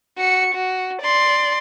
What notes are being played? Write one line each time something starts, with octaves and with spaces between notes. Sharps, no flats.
F#4 C#7
F#4
D5 C6